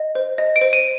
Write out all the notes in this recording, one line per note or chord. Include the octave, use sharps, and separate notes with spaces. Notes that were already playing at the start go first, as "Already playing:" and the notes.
Already playing: D#5
C5
D#5
D7
C5
D#7